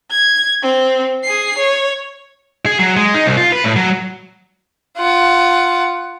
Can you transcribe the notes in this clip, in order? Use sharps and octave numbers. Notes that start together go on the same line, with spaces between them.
G#6
C4
G#4 C7
C#5
G#4
F#3
G#3
D#4
C2
F4
B4
A2
F#3
F4 F#5